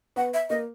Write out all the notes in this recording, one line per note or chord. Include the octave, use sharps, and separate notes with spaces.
B3 F#5
E5
A#3 D#5